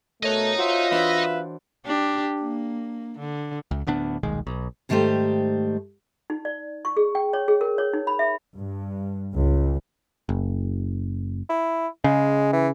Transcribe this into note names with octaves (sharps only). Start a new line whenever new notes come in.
B2 A3 A#4 C#5 D#5 A#5 F#6
F4 F#4 C5 E5 F#5 G5
E3 D4 B4 C5 E5
D4 G4
A#3
D3
C#2
D1 D2 B3 D4
D#1 B1 D#3 G#3
B1
G#2 D#3 G3 A3 G4 C5
D#4
D5
C#6
G#4
G5
C#5
G#4
A#4
C#5
D#4
B5
E5
G2
C#2
F#1
E4
C#3 G#3
E3